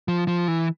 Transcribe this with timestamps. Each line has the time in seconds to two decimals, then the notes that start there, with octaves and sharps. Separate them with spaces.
0.08 F3
0.27 F3
0.48 E3